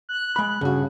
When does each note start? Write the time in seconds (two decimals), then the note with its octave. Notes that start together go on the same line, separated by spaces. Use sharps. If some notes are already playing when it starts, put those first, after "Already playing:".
0.09 F#6
0.36 G#3 B5
0.61 G2 C#3 F#4